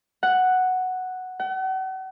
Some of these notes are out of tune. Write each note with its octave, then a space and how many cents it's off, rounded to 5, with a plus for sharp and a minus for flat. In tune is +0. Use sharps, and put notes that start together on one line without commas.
F#5 +0
F#5 +40